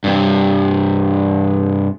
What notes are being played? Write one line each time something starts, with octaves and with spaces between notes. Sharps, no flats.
G2 C3